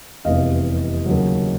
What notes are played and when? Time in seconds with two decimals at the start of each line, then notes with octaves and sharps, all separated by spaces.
0.25 F1 E2 C3 E3 D#5 F5
1.06 D#2 C#3 F#3